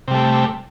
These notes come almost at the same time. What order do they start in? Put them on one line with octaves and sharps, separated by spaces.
C3 G3 A3